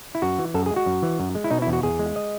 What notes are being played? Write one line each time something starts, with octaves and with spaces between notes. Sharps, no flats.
E4
F#2 F#4
E3
F#2 A4
G#4
G#3
F#4
F#2
E3
F#2
G#3
E4
B2 D#4
E4
E2
F#4
E2 G#4
G#3
D#5